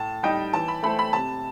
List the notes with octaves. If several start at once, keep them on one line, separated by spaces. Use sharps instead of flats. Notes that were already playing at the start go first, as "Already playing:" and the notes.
Already playing: A2 A5
G3 D#4 G4 D#5 G5
E3 A5
B5
A3 E4 A4 C5 B5
B5
C3 A5